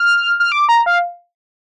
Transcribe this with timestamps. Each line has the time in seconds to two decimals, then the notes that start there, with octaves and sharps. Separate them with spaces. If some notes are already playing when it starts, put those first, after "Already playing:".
Already playing: F6
0.40 F6
0.52 D6
0.69 A#5
0.86 F5